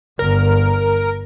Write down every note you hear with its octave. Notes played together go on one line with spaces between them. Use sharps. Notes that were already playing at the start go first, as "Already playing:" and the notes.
G1 A#4